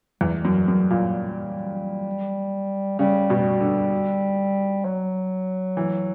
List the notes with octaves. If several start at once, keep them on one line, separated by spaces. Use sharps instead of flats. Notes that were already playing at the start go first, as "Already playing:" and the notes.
E2 G3
F#2
F#2
A#2
C#3 G3
B2
D3
F#3
E3